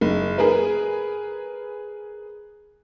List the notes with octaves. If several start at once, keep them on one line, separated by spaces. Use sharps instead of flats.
F#1
G#4 A#4 B4